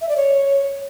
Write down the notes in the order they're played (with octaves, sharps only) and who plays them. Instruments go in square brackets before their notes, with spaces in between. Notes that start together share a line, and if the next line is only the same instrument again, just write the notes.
[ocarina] E5
D5
C#5